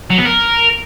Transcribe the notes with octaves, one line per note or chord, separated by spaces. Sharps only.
F#3
B3
A#4